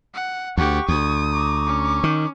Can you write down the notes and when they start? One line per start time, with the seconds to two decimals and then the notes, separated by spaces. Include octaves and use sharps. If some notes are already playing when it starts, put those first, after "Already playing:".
0.14 F#5
0.57 D2 G4 F#5 C#6
0.88 D2 D#6
1.31 A#5 C#6 D6
1.67 C#4
2.04 D#3